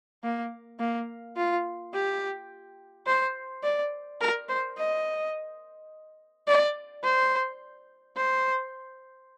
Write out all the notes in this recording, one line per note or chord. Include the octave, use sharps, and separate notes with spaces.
A#3
A#3
F4
G4
C5
D5
A#4
C5
D#5
D5
C5
C5